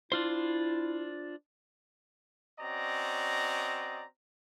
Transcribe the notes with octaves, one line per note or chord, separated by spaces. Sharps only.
D4 E4 F4 C5
C4 C#4 F#4 D5 D#5 A#5